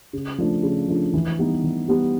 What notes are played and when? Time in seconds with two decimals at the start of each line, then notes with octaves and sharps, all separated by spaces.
0.13 C#3
0.38 F3 A3 D4
0.63 C#3
0.88 F3 A3 D4
1.14 E3
1.39 G3 B3 D#4 G4
1.64 E3
1.88 G3 B3 D#4 G4